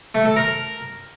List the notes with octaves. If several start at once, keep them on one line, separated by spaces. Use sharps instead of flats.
A3
A4
A#4